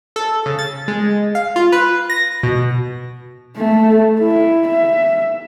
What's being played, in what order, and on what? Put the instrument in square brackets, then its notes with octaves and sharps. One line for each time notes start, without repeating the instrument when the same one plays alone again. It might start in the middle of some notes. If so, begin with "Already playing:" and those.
[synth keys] A4
C#3
A6
G#3
F5
F4
B4
A#6
B2
[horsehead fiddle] A3
E4
E5